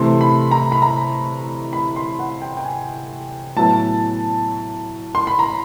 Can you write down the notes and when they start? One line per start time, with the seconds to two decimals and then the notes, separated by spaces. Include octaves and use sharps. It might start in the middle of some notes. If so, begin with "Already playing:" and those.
Already playing: C3 E3 A3 C6
0.21 B5
0.51 A#5
0.72 B5
0.82 A#5
1.73 B5
1.96 C6
2.19 F#5
2.42 G5
2.57 G5
2.65 G#5
3.56 A2 F#3 B3 E4 A5
5.15 C6
5.27 B5
5.39 A#5